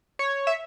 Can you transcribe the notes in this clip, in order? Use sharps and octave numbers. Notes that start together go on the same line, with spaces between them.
C#5
E5